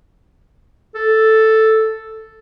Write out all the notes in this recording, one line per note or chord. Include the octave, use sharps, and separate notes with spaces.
A4